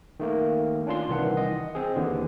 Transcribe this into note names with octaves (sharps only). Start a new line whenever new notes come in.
D#3 A3 A#3
C#4 D4 F4 C6
C2 D#3 E3 F#5
D#5
C4 G#4
D#2 D3 E3